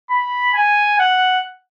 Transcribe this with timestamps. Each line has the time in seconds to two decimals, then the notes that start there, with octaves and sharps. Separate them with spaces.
0.10 B5
0.54 G#5
0.99 F#5